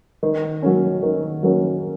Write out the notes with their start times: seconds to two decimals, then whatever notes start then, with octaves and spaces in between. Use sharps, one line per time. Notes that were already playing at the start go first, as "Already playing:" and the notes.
0.23 D#3
0.63 F#3 A#3 C#4
1.03 D#3
1.43 F#3 A#3 C#4